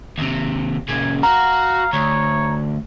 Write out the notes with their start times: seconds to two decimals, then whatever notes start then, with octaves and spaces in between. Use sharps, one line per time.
0.18 D#2 C3
0.88 A#2 C#3 G#5
1.23 F#4 F5 A#5
1.93 D2 C#5